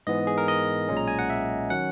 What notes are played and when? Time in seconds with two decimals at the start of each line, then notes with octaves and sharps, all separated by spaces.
0.07 G#2 E3 B3 D#5
0.27 G#4
0.38 A#4
0.48 D#5
0.89 B1 A#2 G#3 C#4
0.97 A#5
1.08 G#5
1.19 F#5
1.30 E5
1.70 D#3 F#3 C#4 F#5